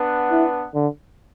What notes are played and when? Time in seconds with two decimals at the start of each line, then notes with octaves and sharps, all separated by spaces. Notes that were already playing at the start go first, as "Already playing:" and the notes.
Already playing: B3 D4 B4 F#5
0.31 E4
0.74 D3